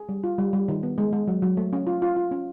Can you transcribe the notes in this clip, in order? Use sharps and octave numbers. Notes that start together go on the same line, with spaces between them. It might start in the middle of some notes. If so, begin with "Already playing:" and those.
Already playing: G#4
G3
F4
G3
G3
D#3
B3
G#3
G#3
F#3
F#3
A3
C#4
F4
F4
F4
C#4